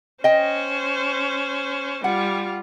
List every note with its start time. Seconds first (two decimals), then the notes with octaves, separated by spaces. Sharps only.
0.24 C#4 C5 D#5 G5
2.04 G3 F4 F#5